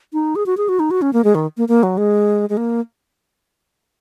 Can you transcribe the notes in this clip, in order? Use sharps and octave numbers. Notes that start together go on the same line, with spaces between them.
D#4
G#4
F#4
G#4
F#4
D#4
F#4
C#4
A#3
G#3
D#3
A#3
A#3
F#3
G#3
G#3
A#3